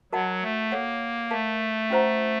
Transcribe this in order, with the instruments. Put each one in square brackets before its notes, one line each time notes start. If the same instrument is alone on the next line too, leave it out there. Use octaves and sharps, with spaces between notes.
[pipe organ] F#3 [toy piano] F#4 A#4 D#5 F#5 A5
[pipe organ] A3
[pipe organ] A#3 [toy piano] A4 C#5 F#5
[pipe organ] A3 [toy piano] A#4 F5 A5
[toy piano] C#4 F4 C5 F#5 A#5